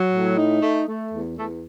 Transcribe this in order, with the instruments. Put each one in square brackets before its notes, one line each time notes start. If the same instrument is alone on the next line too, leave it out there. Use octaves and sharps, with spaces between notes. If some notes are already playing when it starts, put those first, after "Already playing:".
Already playing: [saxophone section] F#3
A2
D#4
A3
A3
E2
E2 A3 A4